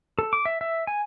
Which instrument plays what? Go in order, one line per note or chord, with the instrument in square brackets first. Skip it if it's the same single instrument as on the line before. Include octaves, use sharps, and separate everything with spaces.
[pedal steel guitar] A4
D6
E5
E5
G#5